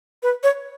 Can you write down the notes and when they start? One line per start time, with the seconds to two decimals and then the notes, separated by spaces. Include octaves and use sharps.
0.23 B4
0.43 C#5